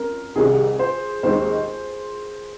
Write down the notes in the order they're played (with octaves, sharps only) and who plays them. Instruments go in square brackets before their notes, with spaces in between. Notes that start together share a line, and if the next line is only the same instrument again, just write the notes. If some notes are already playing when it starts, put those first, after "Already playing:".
Already playing: [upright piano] C4 C#4 A#4
[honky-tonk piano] C2 C3 D#3 [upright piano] G#4
[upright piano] C5
[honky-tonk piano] D#2 D#3 G#3 C4 D#4 [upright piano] C5